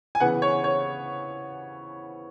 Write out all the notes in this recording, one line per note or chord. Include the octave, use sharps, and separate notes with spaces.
G#5
C#3 E3 B3 F#5
C#5
C#5